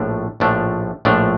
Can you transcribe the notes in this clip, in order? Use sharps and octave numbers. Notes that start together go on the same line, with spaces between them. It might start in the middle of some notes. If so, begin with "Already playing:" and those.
Already playing: A#1 A2 F3 A3 D4
A#1 A2 F3 A3 D4
A#1 A2 F3 A3 D4